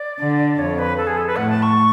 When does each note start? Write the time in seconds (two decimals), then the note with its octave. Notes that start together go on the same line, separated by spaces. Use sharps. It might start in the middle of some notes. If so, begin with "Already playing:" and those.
Already playing: D5
0.19 D3
0.53 D5
0.59 F2 C#5
0.79 B4
0.98 A4
1.07 G#4
1.17 A4
1.27 B4
1.36 A2 F#5
1.49 A5
1.62 C#6